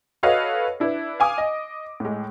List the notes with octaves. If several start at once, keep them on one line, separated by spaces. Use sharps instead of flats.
F#4 A4 B4 C#5 D#5 F5
D4 E4 B4
F5 G#5 D6 D#6
D#5
A2 G#3